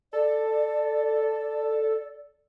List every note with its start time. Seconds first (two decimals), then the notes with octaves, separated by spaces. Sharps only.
0.13 A4 D5